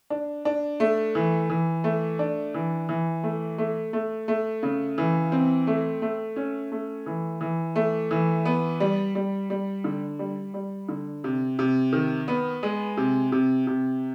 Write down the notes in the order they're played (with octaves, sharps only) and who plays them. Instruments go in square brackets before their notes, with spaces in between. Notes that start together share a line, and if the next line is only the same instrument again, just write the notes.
[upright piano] D4
D4
A3
E3
E3
A3
D4
E3
E3
A3
A3
A3
A3
C#3
E3
C4
A3
A3
C#4
A3
E3
E3
A3
E3
B3
G3
G3
G3
D3
G3
G3
D3
C3
C3
D#3
B3
G#3
C3
C3
C3